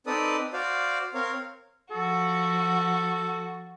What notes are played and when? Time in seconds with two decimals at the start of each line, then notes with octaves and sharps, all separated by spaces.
0.07 C4 D#4 A4 B4 D5 D#6
0.53 F#4 C5 D5 F5
1.14 C4 A#4 C#5 F5
1.91 F3 F#4 A4